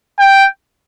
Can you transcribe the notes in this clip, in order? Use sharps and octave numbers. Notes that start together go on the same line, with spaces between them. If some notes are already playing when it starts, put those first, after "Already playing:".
G5